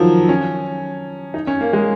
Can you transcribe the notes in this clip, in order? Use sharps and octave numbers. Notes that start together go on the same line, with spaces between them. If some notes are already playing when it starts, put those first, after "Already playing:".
Already playing: D#3 F3 F#3
C#4
D#4
C#4
A#3
G#3